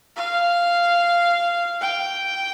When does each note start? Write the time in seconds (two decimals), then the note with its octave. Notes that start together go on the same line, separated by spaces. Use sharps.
0.16 F5
1.81 G5